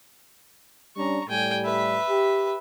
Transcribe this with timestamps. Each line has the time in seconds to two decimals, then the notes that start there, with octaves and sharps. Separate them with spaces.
0.97 G3 C#4 D4 A#5 C#6
1.29 A2 G3 G5 G#5
1.65 B4 E5
2.09 G4